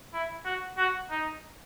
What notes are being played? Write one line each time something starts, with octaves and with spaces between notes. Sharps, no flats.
E4
F#4
F#4
D#4